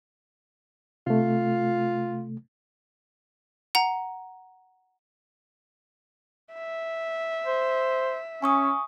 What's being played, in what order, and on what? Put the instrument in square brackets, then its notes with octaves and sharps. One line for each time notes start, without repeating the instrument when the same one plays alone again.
[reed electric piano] C3 A3 [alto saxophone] F4
[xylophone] F#5 A#5
[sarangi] E5
[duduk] C5
[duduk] C#4 [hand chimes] G#5 C#6 D#6